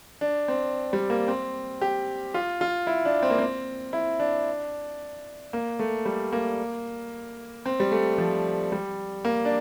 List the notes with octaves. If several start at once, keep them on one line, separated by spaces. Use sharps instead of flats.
D4
C4
G3
A#3
C4
G4
F4
F4
E4
D4
C4
A#3
C4
E4
D4
A#3
A3
G3
A#3
C4
G3
A3
F3
G3
A#3
D4